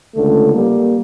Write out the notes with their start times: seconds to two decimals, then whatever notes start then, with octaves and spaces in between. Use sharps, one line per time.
0.15 C#2 D3 A3
0.54 G3 A#3